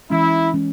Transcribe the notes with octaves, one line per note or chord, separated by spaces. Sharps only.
E3 G#3 C#4 E4
E3 G#3 C#4